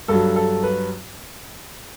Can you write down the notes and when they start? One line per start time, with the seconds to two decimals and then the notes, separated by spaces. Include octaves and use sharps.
0.08 G2 F#3 A4
0.36 A4
0.63 B4